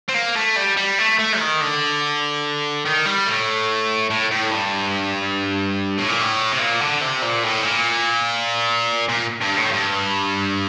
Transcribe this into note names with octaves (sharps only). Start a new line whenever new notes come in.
C4
A#3
A3
G3
G3
A3
A3
D#3
D3
D#3
G3
A2
A2
A2
G2
A2
A#2
A2
C3
A#2
D3
C3
A#2
A2
A#2
A#2
G2
A2
G2